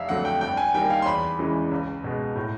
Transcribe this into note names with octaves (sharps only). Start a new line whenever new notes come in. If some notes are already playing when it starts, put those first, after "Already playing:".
Already playing: F1 E5 F5
F2 D3 F#3 A3 F#5
G5
G2 G5
G#5
D#3 G3 A#3 D#4 G5
F5
C6
E2 B5
C#3 E3 G#3
C#2
B2 G#3
A2